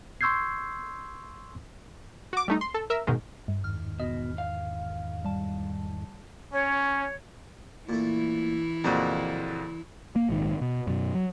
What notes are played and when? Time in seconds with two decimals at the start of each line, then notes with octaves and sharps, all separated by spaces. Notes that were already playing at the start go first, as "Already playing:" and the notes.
0.21 C6 C#6 E6 G6 G#6 C7
2.33 F#4 D6
2.48 G3 A3 D#4
2.61 C6
2.74 A4
2.90 A#4 E5
3.07 G#2 B2 D#3 G#3
3.48 G2
3.64 E2 G#2 D#3 F6
4.00 B2 D#5
4.38 F5
5.24 G3 A5
6.53 C#4 C#5
7.89 A#2 E3 A3 E4
8.84 F2 A#2 C#3 A#3 F#4 C5
10.16 A#3
10.29 A#1 G#2 D#3
10.61 B2
10.87 F#2 B2
11.14 F#3